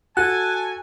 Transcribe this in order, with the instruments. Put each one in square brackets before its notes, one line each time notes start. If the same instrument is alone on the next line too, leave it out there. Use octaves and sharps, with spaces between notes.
[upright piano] F#4 A4 [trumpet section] G#5 [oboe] A5 [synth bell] F#6